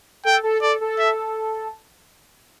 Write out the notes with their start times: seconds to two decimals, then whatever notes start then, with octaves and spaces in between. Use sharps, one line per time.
0.25 A4 G5
0.43 A4
0.62 A4 D5
0.81 A4
0.99 E5